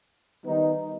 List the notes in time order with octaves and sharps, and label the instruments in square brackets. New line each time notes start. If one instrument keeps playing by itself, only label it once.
[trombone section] D#3 G3 B3 D#4